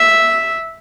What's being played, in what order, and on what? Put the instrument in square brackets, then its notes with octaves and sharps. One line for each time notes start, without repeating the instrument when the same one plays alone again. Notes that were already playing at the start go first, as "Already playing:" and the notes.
Already playing: [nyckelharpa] E5